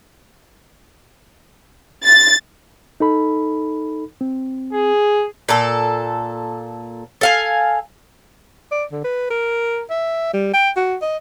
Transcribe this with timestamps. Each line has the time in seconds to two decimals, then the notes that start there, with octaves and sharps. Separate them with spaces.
2.04 A6
3.00 D#4 A4 B5
4.21 C4
4.73 G#4
5.49 A#2 A4
7.21 A4 F5 G#5
8.71 D5
8.92 D3
9.04 B4
9.30 A#4
9.90 E5
10.33 G3
10.54 G5
10.76 F#4
11.02 D#5